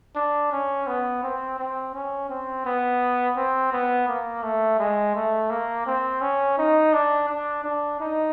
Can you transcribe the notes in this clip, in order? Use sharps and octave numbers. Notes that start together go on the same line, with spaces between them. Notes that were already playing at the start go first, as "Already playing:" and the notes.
D4
C#4
B3
C4
C4
C#4
C4
B3
C4
B3
A#3
A3
G#3
A3
A#3
C4
C#4
D#4
D4
D4
D4
D#4